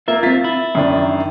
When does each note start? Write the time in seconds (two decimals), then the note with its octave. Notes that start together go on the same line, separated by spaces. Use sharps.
0.08 A#3 F4 E5
0.23 C4 F4 A6 B6
0.44 E4
0.75 F#2 D#3 D4